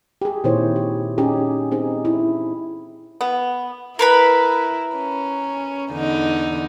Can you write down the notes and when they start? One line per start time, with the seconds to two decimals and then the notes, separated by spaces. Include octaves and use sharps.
0.22 G4 G#4
0.44 A#2 D#3 C4 E4 C5 C#5
0.76 G4
1.18 C#4 D#4 G4 G#4
1.71 C4 D#4 G#4
2.05 E4
3.21 B3
3.99 E4 A#4 B4 B5
4.96 C#4
5.91 E2 D3 D#4